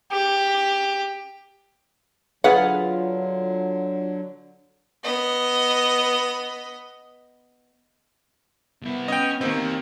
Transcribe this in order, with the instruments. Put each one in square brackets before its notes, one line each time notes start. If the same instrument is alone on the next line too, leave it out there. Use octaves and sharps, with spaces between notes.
[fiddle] G4
[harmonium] D3 F#3 [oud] F4 G#4 B4 [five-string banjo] F#5
[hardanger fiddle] B3 D#5
[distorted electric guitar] C2 E4 [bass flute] B3
[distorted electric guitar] C#4 [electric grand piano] D#5 G5
[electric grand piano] D#3 A#3 C4 [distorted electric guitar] G4 D#5